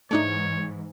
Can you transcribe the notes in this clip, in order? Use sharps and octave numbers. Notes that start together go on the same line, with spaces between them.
G#2 E3 A3 D4 D#4 C#5